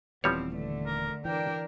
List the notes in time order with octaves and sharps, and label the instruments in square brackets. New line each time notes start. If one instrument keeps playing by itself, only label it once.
[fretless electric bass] D#1 E3 B3 [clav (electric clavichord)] F3 G3 C#5 [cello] C4
[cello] D3 A3
[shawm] A#4
[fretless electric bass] E3 [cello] D4 A#4 [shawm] G5